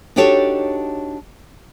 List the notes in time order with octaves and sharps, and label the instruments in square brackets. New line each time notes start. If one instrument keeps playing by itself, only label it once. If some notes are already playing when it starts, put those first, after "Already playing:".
[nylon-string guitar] D4 D#4 F#4 G4 A4 C#5